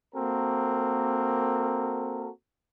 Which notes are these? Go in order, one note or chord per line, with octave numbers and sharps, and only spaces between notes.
A#3 C4 F#4 A4 A#4